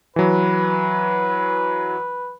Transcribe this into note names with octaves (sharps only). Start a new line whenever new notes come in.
E3 F#3 B4